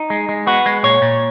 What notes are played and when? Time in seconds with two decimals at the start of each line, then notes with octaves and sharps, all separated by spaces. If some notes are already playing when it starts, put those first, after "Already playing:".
Already playing: D#4
0.10 G#3
0.29 G#3
0.47 B3 F#4
0.66 G#3
0.83 A#2 C#5
1.02 A#2